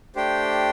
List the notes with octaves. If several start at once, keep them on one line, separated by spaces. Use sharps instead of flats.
A3 D4 G4 C5 G5